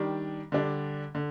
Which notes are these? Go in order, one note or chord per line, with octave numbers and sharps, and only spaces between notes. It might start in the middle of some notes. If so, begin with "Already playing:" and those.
Already playing: D#3 G3 D4
D3 G3 D4
D3